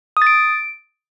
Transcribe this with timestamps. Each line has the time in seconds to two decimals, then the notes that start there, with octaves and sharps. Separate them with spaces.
0.17 D#6
0.22 A6
0.27 D7